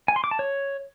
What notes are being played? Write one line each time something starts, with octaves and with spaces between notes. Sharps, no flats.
G#5
C6
D6
A5
C#5